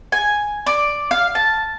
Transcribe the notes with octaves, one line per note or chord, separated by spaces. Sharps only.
G#5
D5
F5
A5